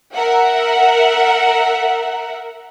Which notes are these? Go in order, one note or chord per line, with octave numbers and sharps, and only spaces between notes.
A#4 E5 F#5